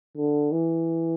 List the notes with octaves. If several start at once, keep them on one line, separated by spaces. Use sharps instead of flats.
D3
E3